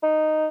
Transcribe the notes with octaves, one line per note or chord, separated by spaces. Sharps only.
D#4